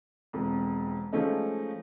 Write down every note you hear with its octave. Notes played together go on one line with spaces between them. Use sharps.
E1 F2
F3 G#3 A3 C#4 D#4